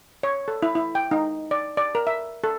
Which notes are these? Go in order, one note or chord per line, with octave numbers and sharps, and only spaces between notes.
C#5
A4
E4
E4
G5
D#4
D5
D5
A#4
E5
A4